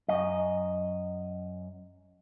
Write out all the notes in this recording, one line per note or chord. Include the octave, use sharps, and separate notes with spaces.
F#2 D#5